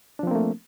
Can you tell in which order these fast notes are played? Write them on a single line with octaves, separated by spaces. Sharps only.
D4 F3 C4 A#3 A3